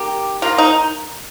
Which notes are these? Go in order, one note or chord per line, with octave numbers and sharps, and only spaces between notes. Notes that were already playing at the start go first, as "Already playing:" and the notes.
Already playing: D#3 A#3 G4
D#3 A#3 F4
D#4